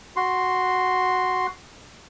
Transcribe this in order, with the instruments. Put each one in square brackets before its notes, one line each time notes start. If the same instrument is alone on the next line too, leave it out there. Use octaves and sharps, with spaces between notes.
[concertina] F#4 C6